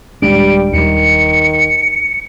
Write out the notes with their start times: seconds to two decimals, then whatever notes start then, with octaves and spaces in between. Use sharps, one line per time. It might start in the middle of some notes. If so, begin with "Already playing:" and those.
0.22 D#1 G3 G#3 D4 D7
0.73 D#2 D#3 G3 C#7